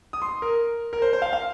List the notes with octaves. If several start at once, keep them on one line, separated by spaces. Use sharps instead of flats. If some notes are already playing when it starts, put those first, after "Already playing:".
D#6
C6
A#4
A#4
C5
C5
F5
F5